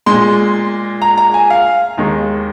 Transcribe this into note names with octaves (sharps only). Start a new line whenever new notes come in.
A#2 G#3 C6
A#5
A#5
G#5
F5
D#2 D#3 G#3